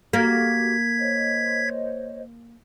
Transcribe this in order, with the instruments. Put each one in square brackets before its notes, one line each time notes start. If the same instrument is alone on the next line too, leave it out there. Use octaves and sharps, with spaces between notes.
[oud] A#3 [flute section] F#4 G4 [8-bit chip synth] G#6 B6
[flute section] C5 C#5 D#5